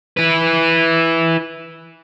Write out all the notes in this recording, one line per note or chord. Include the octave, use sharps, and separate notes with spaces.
E4 B4